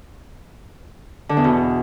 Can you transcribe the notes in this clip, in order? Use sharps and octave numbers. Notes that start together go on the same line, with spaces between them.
D3
E2
B2